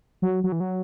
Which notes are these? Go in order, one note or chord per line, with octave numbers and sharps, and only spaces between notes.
F#3
F#3
E3
F#3